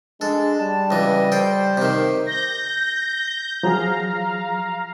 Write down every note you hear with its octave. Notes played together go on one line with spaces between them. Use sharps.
G#3 D4 A4
G3 A5
C#2 E3 D#5
A4 C5 G5
C3 D#3
G6 A#6
F3 F#3 G#4 F5 A#5